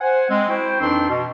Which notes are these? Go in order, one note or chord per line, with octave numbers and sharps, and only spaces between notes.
C5 F#5 G#5
G#3 C4
E4 F#4 C5 G5
F2 E3 C4 D4 D#4 C6
B2